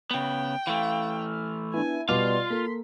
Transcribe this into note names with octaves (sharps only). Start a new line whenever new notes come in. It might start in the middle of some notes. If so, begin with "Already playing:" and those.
C#3 B3 G5
E3 A3 F5
F6
B3 D4 E4 G#5
B2 G3 B3 F4 D5 F5 C6
A#3 A4 B6